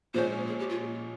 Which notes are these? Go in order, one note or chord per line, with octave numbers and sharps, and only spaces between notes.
A#2 F3 G#3 C#4 C5
G#4
G4
F4